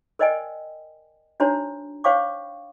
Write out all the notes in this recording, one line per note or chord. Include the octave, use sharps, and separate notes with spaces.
A#4 C5 D5 D#5 G5 G#5
D4 D#4 F#4 C5 C#5 A#5
C5 C#5 F5 G5 C#6 D6